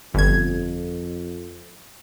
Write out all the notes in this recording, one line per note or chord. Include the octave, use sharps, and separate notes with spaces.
G1 F2 G#6